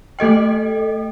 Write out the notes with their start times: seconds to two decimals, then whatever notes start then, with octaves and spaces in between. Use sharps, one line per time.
0.19 A3 A4 D#5 G5